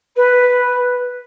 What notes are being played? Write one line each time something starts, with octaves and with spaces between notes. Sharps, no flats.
B4